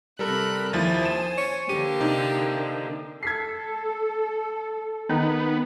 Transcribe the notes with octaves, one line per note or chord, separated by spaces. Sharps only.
C3 G3 A4 A#4 B5 F#6
D#2 F3 E4 C5 G#5 A6
E7
C#5
D3 A#3 G4 D#7
C3 D#4
A4 G#6 B6 C7
D#3 B3 D#4